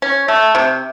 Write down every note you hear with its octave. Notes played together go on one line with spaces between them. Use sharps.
C#4
A3
C3